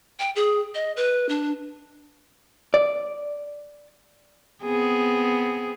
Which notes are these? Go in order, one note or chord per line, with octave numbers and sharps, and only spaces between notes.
G5
G#4
D#5
B4
D4
D5
B3 C4 G#4